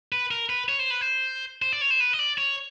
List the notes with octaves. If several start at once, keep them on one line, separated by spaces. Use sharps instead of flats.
B4
A#4
B4
C#5
C5
B4
C5
C5
D5
C#5
C5
B4
D#5
D5
C#5